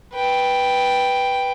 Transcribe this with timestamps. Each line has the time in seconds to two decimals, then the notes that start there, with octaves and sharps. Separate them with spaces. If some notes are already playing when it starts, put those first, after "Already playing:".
0.14 B4 G5